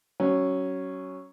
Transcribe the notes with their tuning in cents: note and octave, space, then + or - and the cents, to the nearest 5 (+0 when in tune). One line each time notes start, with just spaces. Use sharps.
F#3 +25 C#4 +0